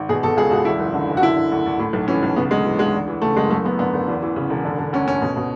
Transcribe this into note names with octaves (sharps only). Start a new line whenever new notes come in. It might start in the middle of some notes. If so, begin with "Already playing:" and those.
Already playing: G#1
B2 G#4
B2 A4
C#2 G#4
C#2 F#4
E2 E4
F#1
D3
F#1
F#4
D3 E4
D3
D2
D2
A2
B1
E3 C#4
B1
C#3 B3
D2 G#3
E3
D2 G#3
E2
E3
C#3 A3
F#1 G#3
F#2 A3
F#1 B3
D3 B3
F#1
E2
E3
C#3
E1
D3
D3
D2 C#4
D2 C#4
B2
B2